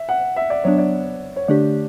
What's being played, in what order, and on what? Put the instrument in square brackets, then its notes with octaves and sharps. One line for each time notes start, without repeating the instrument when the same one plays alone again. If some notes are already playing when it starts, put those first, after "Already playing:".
Already playing: [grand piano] E5
F#5
E5
D5
[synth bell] F#3 B3 D4 [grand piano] C#5
[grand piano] D5
C#5
[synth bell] D3 A3 D4 G4 [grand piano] D5